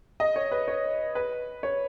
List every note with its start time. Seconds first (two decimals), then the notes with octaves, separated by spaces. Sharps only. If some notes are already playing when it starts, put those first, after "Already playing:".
0.20 D#5
0.36 C#5
0.51 B4
0.68 C#5
1.15 B4
1.63 C#5